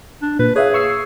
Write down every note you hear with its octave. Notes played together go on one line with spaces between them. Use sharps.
D4
A#2 B4
G#4 C#5 E5 F5
C#6 E6 C7